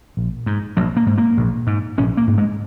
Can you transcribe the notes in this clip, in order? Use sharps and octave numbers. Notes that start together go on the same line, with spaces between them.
A#1
G#2
A#1 F#3
A#3
G#2
A#3
A#1
G#2
A#1 C#4
A#3
G#2
G#3